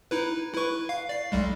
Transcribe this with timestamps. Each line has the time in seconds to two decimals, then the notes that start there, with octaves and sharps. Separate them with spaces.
0.11 D#4 E4 B4
0.54 E4 B4 C#6
0.89 F5
1.09 D5 C7
1.32 B1 G3 G#3